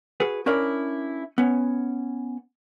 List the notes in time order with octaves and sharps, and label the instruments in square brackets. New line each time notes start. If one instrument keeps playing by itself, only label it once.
[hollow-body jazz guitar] F#4 G#4 B4
C#4 D4 E4 A#4 D5
B3 C#4